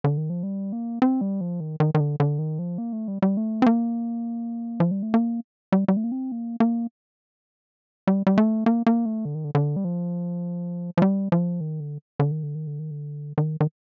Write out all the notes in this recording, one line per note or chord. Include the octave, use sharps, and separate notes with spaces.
D3
D#3
F3
G3
A#3
C4
G3
F3
D#3
D#3
D#3
D3
D3
D#3
F3
A#3
A3
G3
G3
A3
C4
A#3
F3
G3
A3
A#3
G3
G3
A3
A#3
C4
A#3
A#3
G3
G3
A3
A#3
A#3
A3
D3
D#3
D3
D3
G3
F3
F3
G3
F3
D#3
D3
D3
D#3
D3
D#3
D3
D#3
D3
D#3
D#3